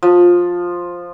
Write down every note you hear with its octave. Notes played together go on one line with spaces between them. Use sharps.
F3